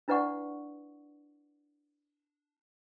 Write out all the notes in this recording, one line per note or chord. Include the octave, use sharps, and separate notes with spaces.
D4 E4 B4 D5 F#5 C#6